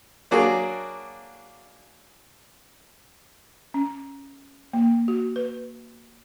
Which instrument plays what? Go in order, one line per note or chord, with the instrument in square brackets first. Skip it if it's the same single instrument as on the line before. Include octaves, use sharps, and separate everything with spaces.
[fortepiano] F#3 A#3 D4 F#4 G#4
[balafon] C#4
A#3
F#4
B4